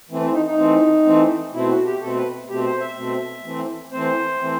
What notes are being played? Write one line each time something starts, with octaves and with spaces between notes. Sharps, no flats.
E3 A3 C4
C4
D#4
D#4
E3 A3 C4
E3 A3 C4
B2 A3 C4 E4
F#4
G4
B2 A3 C4 A4
B4
B2 A3 C4 G4
C5
E5
B2 A3 C4
E3 A3 C4
E3 A3 C4 C5
E3 A3 C4